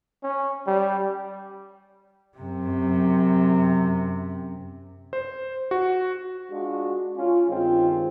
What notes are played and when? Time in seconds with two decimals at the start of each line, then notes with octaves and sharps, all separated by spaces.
0.23 C#4
0.67 G3
2.38 F#2 C3
5.13 C5
5.71 F#4
6.51 G#3 D4 F4 F#4
7.16 C#4 F4
7.49 G2 D#3 G#3 C4 F4